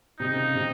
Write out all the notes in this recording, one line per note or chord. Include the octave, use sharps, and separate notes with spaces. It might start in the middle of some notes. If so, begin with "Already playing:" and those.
C3 D#4
C#3
C3